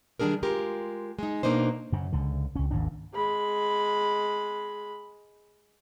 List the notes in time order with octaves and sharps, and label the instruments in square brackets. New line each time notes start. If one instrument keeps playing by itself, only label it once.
[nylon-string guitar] D#3 G3 C#4 D4 G#4 A#4
G#3 F4 G4 A#4
G#3 D#4
B2 A#3 D4 D#4 C5
[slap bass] F#2 C#3
C#2 D3
C#2 C#4
G#1 D#2 G#2 D4
[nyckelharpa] G#3 B5